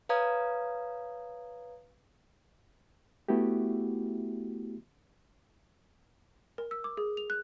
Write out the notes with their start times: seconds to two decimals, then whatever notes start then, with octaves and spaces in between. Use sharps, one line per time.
0.09 B4 C#5 F5 A#5 D#6 G#6
3.28 A3 B3 E4 F#4 G4
6.58 A#4
6.71 E6
6.84 D6
6.97 G#4
7.17 F7
7.30 F#6